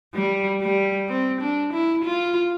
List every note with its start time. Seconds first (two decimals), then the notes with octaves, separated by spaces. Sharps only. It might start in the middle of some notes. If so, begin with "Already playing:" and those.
0.14 G3
0.62 G3
1.09 C4
1.41 D4
1.73 E4
2.05 F4